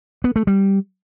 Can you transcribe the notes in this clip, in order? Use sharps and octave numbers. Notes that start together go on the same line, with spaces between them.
B3
A3
G3